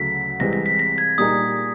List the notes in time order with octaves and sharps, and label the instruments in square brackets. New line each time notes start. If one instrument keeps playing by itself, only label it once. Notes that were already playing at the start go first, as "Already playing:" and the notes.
Already playing: [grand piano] D2 C#3 F#3 A3 [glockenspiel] B6
[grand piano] C2 C3 E3 G#3 C4 [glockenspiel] A#6
[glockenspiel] A#6
B6
A#6
G#6
[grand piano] A#2 G3 A#3 D#4 G#4 [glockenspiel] D#6